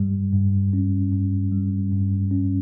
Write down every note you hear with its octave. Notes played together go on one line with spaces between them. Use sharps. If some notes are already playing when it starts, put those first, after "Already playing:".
Already playing: G2 G3
G2
C#4
G2
G3
G2
C#4